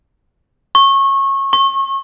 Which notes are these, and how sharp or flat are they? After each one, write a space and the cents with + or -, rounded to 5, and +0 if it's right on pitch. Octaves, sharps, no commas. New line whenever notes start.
C#6 -25
C#6 -35